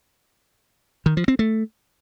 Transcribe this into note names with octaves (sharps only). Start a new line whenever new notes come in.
D#3
F3
C4
A3